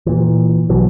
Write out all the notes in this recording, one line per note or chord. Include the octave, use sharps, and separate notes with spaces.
A#2 E3
B1 B2 E3 F#3